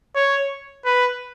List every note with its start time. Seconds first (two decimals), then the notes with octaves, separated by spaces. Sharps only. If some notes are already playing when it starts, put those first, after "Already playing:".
0.15 C#5
0.85 B4